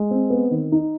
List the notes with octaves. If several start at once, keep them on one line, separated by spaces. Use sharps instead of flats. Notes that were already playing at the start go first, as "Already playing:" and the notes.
Already playing: G#3
C4
B3
D#3
D#4